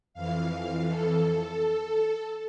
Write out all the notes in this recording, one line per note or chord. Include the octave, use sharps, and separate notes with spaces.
F2 E3 F5
A4